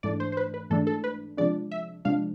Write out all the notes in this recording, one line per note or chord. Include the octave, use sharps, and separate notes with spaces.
G#2 E3 A3 D4 D5
C5
C5
B4
B4
G#2 E3 A3 D4 A4
A4
B4
C3 F3 G#3 D4 D5
E5
C3 F3 G#3 D4 F5